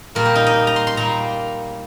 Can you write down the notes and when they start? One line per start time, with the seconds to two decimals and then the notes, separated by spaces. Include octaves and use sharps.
0.15 A#2 G3 A#3 A#4
0.25 G4
0.36 D#4
0.46 D#5
0.67 A#5
0.76 C6
0.87 C6
0.97 A#2 G3 A#3 A#5